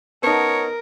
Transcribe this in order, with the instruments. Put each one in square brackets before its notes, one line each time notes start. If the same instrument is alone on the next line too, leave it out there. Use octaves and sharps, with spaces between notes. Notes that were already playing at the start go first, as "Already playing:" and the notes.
[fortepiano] B3 D#4 [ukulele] C#4 F#5 A5 [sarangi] A#4 [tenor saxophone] C#5